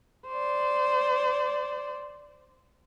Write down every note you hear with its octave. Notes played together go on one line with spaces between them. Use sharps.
C5 D5